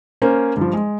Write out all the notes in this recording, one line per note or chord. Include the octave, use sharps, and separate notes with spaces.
A#3 C#4 C5
G2 F3
G#3